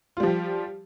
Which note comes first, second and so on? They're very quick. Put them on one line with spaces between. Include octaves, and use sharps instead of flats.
F4 G3 F3 G4